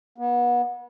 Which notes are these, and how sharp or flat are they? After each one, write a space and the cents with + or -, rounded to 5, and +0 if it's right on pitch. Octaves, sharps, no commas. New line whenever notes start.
B3 -35